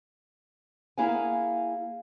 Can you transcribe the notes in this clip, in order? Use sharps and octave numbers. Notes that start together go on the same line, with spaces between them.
A#3 E4 G#4 F5 F#5 G#5